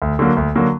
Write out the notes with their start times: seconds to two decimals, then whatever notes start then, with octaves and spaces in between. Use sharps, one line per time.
0.02 D2
0.19 D3 F#3 A#3
0.37 D2
0.55 D3 F#3 A#3